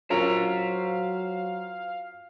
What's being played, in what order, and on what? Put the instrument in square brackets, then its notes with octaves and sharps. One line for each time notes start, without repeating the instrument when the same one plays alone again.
[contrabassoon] F#3 [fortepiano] C#4 F4 A#4 [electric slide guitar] C5 A#5 [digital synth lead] F5